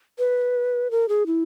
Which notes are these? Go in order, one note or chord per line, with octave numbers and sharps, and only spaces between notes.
B4
A#4
G#4
E4